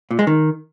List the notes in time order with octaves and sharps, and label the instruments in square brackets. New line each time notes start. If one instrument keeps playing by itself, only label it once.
[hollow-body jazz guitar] A#2
G#3
D#3